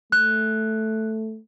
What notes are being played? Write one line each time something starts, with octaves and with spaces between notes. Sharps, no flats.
A3 F#6